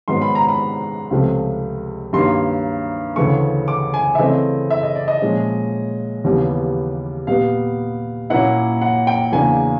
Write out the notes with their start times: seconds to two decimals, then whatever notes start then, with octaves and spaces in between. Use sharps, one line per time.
0.08 G#2 D#3 F#3 B3 C6
0.22 B5
0.35 A#5
0.49 B5
1.11 C#2 C3 F3 A3
2.13 G2 D#3 F#3 A#3 C6
3.16 D2 C#3 E3 A3 C#6
3.68 D6
3.94 G#5
4.15 E5
4.19 C#3 E3 A3 C4 D#5
4.71 E5
4.83 D#5
4.95 D5
5.08 D#5
5.22 A#2 F3 G#3 C#4
6.24 D#2 C#3 E3 G3 B3
7.27 A#2 G3 B3 F5
8.30 A#2 F#3 A#3 C#4 E4 F#5
8.81 F#5
9.07 G5
9.32 E2 C#3 F#3 A#3 D4 G#5